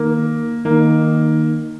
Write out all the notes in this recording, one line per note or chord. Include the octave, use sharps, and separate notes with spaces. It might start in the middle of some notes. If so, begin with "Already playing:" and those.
Already playing: D#3 A#3
D#3 A#3